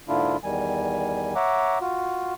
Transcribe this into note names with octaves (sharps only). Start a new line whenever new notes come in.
G#2 D3 A#3 D4 E4 F4
E2 D#3 G3 G#5
C#5 E5 F#5 A#5 D6
F4 F#4